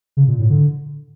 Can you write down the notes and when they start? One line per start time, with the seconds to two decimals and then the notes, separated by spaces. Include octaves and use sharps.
0.17 C#3
0.28 A#2
0.39 A2
0.50 D3